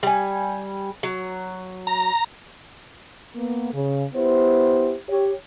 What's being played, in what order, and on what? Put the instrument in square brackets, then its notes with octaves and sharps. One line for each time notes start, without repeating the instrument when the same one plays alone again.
[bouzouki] G3 G#5
F#3
[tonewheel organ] A#5
[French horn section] A#3 B3
C#3
B3 E4 G4 C5
G4 C#5